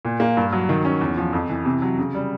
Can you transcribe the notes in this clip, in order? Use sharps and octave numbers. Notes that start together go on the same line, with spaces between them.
A#2
A#3
G2
F#3
D#3
C#4
E2
F3
F2
E3
C3
F#3
C#3
G3